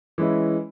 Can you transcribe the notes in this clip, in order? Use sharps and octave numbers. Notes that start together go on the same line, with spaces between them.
E3 G#3 C#4 E4